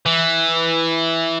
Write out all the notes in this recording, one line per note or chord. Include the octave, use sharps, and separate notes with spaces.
E3